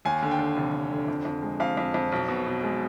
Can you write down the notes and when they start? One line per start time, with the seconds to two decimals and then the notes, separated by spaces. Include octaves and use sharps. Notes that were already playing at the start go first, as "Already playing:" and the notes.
0.05 D#2 G#5
0.22 D3
0.31 G5
0.39 D3
0.57 F1
0.74 F1
0.91 D3
1.08 F2
1.25 F2
1.42 G#3
1.60 F2 F5
1.77 F2
1.94 F2
2.12 B1
2.28 B2
2.46 B2
2.63 G#3